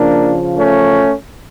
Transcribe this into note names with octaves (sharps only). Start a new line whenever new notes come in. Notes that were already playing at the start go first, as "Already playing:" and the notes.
Already playing: C#3 F3 A#3 D4
A3 C#4